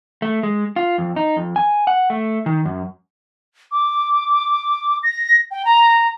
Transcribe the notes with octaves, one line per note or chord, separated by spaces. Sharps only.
A3
G#3
F4
F2
D#4
F2
G#5
F#5
A3
D#3
F#2
D6
A#6
G5
A#5